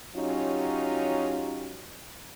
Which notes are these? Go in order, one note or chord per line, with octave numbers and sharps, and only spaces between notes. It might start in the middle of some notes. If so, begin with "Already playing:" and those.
F#3 C#4 D#4 F4 G4